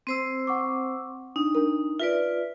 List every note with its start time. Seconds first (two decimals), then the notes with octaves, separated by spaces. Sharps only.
0.07 C4 C5 E6
0.47 F#5 C#6 D6
1.36 D4 D#4
1.55 D4 A#4
1.99 F4 B4 D5 E5